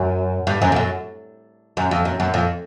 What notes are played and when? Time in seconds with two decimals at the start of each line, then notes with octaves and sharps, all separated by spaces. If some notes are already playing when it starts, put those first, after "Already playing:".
Already playing: F#2
0.47 G2
0.62 F#2
0.72 F2
0.76 F#2
1.77 F#2
1.91 F2
2.05 F#2
2.20 F#2
2.34 F2